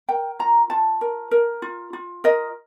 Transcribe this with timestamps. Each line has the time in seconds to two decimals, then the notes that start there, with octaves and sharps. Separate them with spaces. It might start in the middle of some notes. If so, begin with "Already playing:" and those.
0.09 A#4 G5
0.39 F4 A#5
0.70 F4 A5
1.01 A#4
1.31 A#4
1.62 F4
1.93 F4
2.24 A#4 D#5